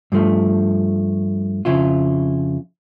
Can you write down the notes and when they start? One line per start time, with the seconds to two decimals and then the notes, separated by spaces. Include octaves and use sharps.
0.12 G2 F3 A3
1.65 F2 C#3 E4 F4